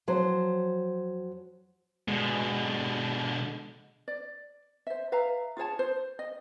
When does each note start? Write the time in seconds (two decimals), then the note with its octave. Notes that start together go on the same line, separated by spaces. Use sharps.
0.08 F2 F#3 C5
2.08 B2 D3 G#3
4.08 D5
4.87 C5 E5
5.12 B4 E5 F5 A#5
5.57 F4 G#4 C#5 A5
5.79 C5
6.19 D#5